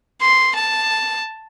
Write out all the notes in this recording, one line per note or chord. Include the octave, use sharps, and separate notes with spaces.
C6
A5